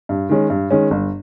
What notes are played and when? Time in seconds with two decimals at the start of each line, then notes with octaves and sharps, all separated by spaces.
0.09 G2
0.29 D#3 G#3 C#4
0.50 G2
0.70 D#3 G#3 C#4
0.91 G1